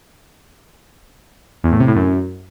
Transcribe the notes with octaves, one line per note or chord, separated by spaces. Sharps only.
E2
A2
C3
A2
F#2